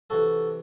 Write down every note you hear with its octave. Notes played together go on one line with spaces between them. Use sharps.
C3 E3 F#4 A4